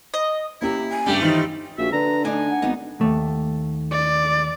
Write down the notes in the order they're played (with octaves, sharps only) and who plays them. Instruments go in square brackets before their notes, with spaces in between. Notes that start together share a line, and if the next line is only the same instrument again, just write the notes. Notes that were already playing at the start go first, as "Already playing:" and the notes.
[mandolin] D#5
[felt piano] A#3 C#4 G4 [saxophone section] E4 [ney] A#5
[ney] G#5
[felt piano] G2 C#3 [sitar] G3 A3 [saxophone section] G4
[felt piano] D#3 E3 [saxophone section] C4 F4 [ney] D#4
[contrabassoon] A#1 [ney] F#4 [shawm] E5
[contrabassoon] D3 [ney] B4 [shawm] A#5
[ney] A3 [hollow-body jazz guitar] D4 D#4 [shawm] G#5
[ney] F#5
[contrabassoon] G#1 [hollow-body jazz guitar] B3 D#4
[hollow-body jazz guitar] D#2 A3
[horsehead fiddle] D5